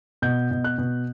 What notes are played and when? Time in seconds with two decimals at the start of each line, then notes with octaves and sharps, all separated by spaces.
0.22 B2 G6
0.51 B2
0.64 F#6
0.78 B2